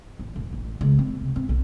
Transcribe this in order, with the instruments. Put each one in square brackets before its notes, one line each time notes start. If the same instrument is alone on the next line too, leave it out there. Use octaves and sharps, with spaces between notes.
[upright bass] A1
E1
A1
C#2
C4
C3
C4
B1